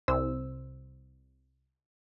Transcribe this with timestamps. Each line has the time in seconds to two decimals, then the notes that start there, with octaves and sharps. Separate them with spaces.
0.08 C2 C5 E6